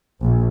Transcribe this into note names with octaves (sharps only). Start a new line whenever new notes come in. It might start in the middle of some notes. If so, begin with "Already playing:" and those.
A#1